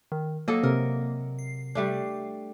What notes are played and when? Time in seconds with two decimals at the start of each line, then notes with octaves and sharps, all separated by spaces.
0.12 D#3
0.48 F#3 A#3 A4 D#5
0.63 C3 A#4
1.39 C7
1.75 G3 A3 D4